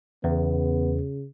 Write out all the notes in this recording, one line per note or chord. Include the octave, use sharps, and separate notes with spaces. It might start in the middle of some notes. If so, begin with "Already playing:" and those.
E2 C#3 B3